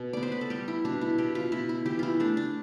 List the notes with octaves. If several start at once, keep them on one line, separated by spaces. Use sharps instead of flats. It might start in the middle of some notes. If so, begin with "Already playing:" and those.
Already playing: B2
B3 D5
C5
B4
A4
G3 G4
E4
B2 D4
E4
B2 G4
F4
B2 E4
E4
E3 G4
E4 F4
A3 D4
D4